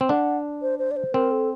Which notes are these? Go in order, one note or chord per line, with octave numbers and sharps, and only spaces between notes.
C4
D4 F#5
C5
C5
D5
C5
C4 A#4
A4